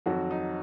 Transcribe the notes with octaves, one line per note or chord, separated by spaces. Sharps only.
F2 D#3 F#3 F#4
D#4